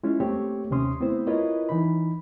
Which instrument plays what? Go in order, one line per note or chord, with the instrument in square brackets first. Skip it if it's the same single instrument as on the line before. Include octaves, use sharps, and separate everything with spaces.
[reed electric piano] G#3 C#4 E4 F4
A3 A#3 C4 G4 C#5
D#2 C3 C#4 C6 D#6
A3 B3 C4 E4 C5
E4 F4 A#4 B4 C#5 D#5
E3 D#4 B5